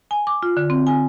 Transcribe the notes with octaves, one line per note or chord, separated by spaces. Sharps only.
G#5
D6
F4
D3
C4
G#5